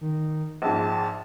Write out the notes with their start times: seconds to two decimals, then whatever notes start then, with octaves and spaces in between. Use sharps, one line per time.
0.01 D#3
0.62 A#1 G#2 A5